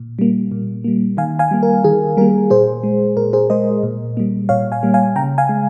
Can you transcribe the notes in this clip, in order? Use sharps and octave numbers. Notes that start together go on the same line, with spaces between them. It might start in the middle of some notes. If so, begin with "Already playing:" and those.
Already playing: A#2
G3 A#3
A#2
G3 A#3
D#3 F5 G#5
F5 G#5
G3 A#3
A#4
D#3 G#4
G3 A#3 A#4
A#2 G#4 C5
G#3
A#2 A#4
G#4 C5
G#3 C5 D#5
A#2
G3 A#3
A#2 C#5 F5
F5 G#5
G3 A#3
F5 G#5
C#3 G5 A#5
F5 G#5
G#3